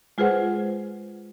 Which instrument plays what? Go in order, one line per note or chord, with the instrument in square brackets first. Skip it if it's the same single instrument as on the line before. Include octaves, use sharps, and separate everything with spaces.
[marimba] G#3 F4 G#4 B4 C5 F#5